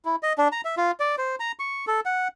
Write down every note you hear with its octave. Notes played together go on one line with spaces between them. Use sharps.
E4
D#5
D4
A#5
E5
F4
D5
C5
A#5
C#6
A4
F#5